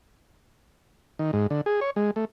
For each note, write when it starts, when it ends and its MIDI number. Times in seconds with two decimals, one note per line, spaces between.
1.19 1.31 51
1.33 1.47 44
1.50 1.61 50
1.66 1.80 68
1.81 1.90 73
1.96 2.11 56
2.16 2.25 57